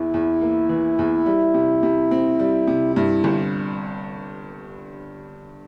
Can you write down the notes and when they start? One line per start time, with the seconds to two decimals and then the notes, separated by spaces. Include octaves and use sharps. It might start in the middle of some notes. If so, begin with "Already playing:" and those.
Already playing: E2 E3 E4
0.14 E2
0.41 A#3
0.69 E3
0.99 E2
1.26 G3
1.54 C3
1.83 C3
2.11 C4
2.39 G3
2.67 C3
2.96 G2 E4
3.24 G1